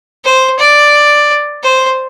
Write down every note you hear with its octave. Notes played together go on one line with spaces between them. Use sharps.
C5
D5
C5